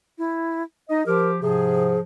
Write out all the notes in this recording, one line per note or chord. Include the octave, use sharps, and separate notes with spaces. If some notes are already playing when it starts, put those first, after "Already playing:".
E4
D#4 D#5
F3 G4 A#4
G#2 C3 F3 G#4